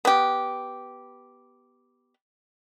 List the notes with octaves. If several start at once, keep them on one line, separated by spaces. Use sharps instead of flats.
B3 G4